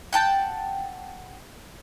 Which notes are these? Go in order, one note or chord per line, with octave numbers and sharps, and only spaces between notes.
F#5 G5 A5